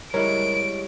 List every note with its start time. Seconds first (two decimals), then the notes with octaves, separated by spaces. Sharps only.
0.14 G3 G#3 E4 A#4 C#5 D#5 D7